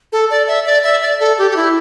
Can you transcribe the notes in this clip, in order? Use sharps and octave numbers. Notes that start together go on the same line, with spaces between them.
A4
D5
E5
D5
E5
D5
A4
G4
G4
E4